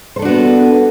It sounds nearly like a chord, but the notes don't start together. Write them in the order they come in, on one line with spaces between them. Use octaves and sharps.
C5 A4 D4 F#4 B3